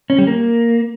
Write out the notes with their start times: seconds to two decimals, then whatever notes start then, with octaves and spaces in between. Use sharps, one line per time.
0.10 C#4
0.18 G3
0.27 A#3